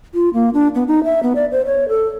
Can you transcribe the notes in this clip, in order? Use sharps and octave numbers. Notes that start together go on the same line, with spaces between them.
F4
A#3
D4
B3
D#4
E5
B3
D5
C5
C#5
A4